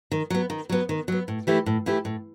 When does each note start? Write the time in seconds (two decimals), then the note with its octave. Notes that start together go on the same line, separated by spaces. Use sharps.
0.12 D#3
0.30 F#3 B3
0.50 D#3
0.69 F#3 B3
0.89 D#3
1.08 F#3 B3
1.28 A2
1.47 E3 A3 E4 G4
1.66 A2
1.86 E3 A3 E4 G4
2.05 A2